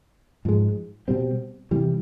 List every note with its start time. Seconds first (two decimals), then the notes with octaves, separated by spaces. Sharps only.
0.45 G#2 F3 G#3
1.08 B2 G3 C4
1.71 C3 E3 G3